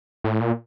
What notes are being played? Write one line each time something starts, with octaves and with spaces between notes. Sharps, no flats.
A2
A#2